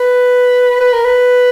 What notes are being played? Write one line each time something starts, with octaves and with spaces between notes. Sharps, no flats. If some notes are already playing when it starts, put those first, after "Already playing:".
Already playing: B4
B4
A#4
B4